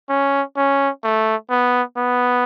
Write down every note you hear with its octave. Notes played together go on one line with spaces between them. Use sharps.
C#4
C#4
A3
B3
B3